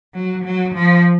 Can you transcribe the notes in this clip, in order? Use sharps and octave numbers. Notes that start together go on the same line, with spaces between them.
F#3
F#3
F3